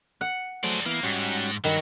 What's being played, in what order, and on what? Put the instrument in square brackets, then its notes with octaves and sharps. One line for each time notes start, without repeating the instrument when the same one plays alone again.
[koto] F#5
[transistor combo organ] F#3 A3 C5 [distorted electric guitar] G#4 D5
[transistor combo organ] E3 B3 [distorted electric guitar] A#3
[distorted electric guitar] G#2 [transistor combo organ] G3 C#4 F#4
[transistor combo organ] G2 B5 [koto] D#3 [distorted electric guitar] F#3